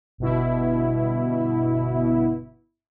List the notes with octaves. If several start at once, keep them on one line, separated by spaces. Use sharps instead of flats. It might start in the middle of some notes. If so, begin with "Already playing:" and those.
G1 B2 E4